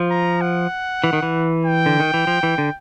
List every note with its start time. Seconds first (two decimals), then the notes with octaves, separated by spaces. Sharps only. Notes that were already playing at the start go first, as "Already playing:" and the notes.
Already playing: F3
0.11 A#5
0.41 F#5
1.04 E3
1.13 D#3
1.23 E3
1.65 G5
1.86 D3
2.00 D#3
2.14 E3
2.27 F3
2.43 E3
2.58 D3